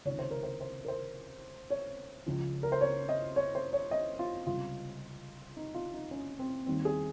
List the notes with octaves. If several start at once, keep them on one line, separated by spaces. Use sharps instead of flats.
C#2 C3 D#3 C#5
C5
A#4
C5
C5
A#4
C5
C#5
C#2 C#3 F3
A#4
C5
C#5
D#5
C#5
C5
C#5
D#5
F4
C#2 C3 G3 F4
D#4
F4
D#4
C#4
C4
D#2 D#3 G3 C4
G#4